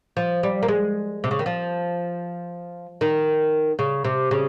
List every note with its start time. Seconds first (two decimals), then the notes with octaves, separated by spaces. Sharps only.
0.17 F3
0.43 G3
0.63 A#3
0.68 G#3
1.24 C3
1.31 C#3
1.39 D#3
1.46 F3
3.01 D#3
3.79 C#3
4.04 C3
4.31 C#3